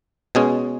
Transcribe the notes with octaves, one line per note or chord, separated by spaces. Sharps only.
B2 G#3 C#4 G#4